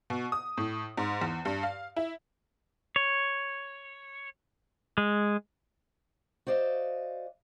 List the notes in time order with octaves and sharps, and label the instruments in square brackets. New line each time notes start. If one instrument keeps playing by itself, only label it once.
[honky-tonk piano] B2
D#6
A2
G#2
E2
G2
F5
E4
[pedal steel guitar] C#5
G#3
[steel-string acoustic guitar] F#4 C5 D5 D#5 F5